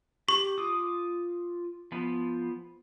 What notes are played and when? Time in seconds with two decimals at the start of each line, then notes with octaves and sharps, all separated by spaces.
0.29 G4 C#6
0.58 F4 D6 D#6
1.92 F3 B3